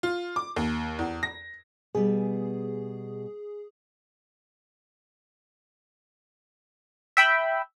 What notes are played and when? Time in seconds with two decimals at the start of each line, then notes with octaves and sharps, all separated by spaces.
0.03 F4
0.36 D6
0.56 D#2
0.99 E2
1.23 A#6
1.95 B2 G3 G#4
7.17 E5 G5 B5